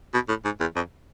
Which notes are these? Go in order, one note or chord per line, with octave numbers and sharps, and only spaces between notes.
B2
A2
G#2
E2
F2